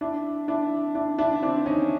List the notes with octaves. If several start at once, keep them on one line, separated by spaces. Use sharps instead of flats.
D4 E4
D4 E4
D4 E4
D4 E4
C4 D4
C#4 D#4